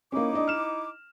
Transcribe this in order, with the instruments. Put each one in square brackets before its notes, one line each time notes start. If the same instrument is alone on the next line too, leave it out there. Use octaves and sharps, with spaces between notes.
[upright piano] A#3 C#4 [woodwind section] D#4 E4 D6
[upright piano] D4 D#5
F6 E7